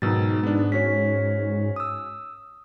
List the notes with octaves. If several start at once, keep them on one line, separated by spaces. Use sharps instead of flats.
G#2 B2 D#3 F#3 D#4 E6 A6
B3 D4
C#4 F#4 C#5 B6
D#6 E6